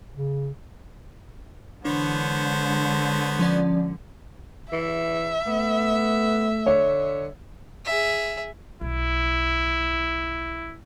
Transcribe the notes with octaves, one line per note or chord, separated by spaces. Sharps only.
C#3
D3 E3 G#3 B3 D4 C5 C#5
F3 C#4 D5
E3 E5
A3 B3
D3 C#5
G#4 E5
B1 E4